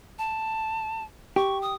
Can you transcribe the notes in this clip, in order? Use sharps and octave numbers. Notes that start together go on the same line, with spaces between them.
A5
G4 C#6
D#6